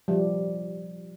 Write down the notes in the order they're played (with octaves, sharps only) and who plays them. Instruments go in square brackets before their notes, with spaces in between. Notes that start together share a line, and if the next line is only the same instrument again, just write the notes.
[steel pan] F3 G3